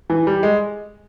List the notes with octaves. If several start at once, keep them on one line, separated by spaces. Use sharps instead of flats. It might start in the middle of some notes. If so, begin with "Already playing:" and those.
E3
G3
G#3